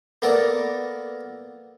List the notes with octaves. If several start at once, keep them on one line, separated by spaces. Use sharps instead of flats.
A#3 B3 A4 A#4 D5